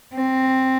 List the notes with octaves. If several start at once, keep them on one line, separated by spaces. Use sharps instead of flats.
C4